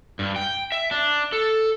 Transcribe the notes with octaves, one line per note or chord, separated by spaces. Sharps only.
G2
G5
E5
D4
A4